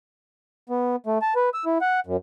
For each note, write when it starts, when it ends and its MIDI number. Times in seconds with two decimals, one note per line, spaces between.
0.69 0.96 59
1.06 1.18 57
1.22 1.34 81
1.36 1.49 71
1.54 1.65 88
1.66 1.78 64
1.81 2.00 78
2.06 2.17 42